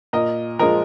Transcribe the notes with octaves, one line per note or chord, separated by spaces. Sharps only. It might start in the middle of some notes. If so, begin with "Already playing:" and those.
A#2 A#4 D#5
F3 G#3 A#4 D#5